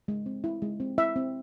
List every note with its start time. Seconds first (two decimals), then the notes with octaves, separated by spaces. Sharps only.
0.08 G#3
0.26 C4
0.44 E4
0.62 G#3
0.80 C4
0.98 E4 E5
1.16 C4